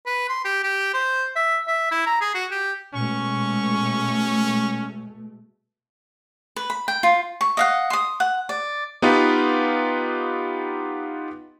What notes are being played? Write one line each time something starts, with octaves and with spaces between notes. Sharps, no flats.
B4
C6
G4
G4
C5
E5
E5
E4
A#5
G#4
F#4
G4
B2 G#3 A3 C#4 C#6
B4
B5
G5
F4
C#6
D#5 F5 F#5
C6 D#6
F#5
D5
B3 D#4 F4 G4 B4